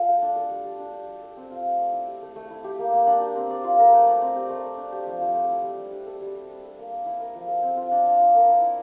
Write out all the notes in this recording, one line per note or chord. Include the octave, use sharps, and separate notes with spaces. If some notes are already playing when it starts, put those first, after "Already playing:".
Already playing: F4 A4
A3
D4
A4
G3
G3
D4
G4
G3
A4
C4
F4
A3
D5
E4
G4
A3
A3
E4
G4
A#3
A#3
D4
G4
C4
D5
F4
A#4
A3
D5
C4
G4
A3
D5
D4
G4
F3
F3
A3
E4
G3
G3
D4
A4
G3
G3
D4
A4
A#3
D5
E4
A#4
F3
A4
C4
F4
D4
F5
F4
A#4
E4
E4